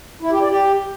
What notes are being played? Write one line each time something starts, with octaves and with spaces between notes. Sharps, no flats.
E4
G4
D5
G4